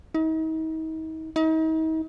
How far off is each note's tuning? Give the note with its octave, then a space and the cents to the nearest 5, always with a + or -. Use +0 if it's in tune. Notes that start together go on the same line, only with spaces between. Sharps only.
D#4 +40
D#4 +40